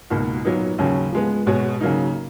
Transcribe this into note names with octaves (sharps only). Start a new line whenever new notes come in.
C#2 B2 A#3 D#4 F#4
A#2 F#3 B3 D#4
D#2 C#3 F#3 C#4
F3 G#3 B3
B2 G#3 B3 F#4 C#5
C#3 F#3 A#3 D#4